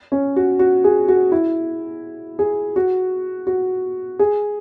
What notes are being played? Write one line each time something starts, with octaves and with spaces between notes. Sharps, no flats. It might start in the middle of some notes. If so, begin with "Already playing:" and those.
C#4
F#4
F#4
G#4
F#4
E4
G#4
F#4
F#4
G#4